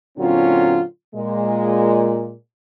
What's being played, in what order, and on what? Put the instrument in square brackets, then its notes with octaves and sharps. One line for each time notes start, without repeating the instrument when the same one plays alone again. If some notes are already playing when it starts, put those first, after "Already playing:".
[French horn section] A#2 D3 F#3 C4 C#4 F4
A#2 G#3